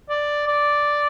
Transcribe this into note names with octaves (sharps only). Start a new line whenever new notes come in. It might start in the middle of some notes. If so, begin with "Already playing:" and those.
D5
D5